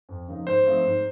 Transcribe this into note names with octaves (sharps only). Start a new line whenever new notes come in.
F2
C#3 F3 A#3 D#4
G#2 C5
F3 A3 C4 D#4
G#2